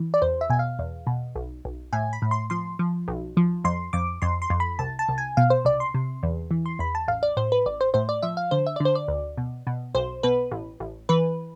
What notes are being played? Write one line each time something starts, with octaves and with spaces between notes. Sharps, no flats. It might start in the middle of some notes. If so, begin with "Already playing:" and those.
Already playing: E3
D5
E2 C5
E5
B2 G#5
F5
E2
B2
B1
B1
A2 G#5
B5
A2
C6
F3 C6
F3
B1
F3
F2 C6
F2 D6
F2 C6
C6
F2
B5
C2 A5
A5
C2
G#5
B2 F5
C5
C2 D5
C6
C3
E2
E3
C6
E2 B5
A5
A1 F5
D5
A2 C5
B4
A1 D5
C5
A2 C5
D5
F3 E5
F5
D3 C5
E5
D3 D5
C5
D5
D2
B2
B2
B1 C5
B2 B4
A1
A1
E3 B4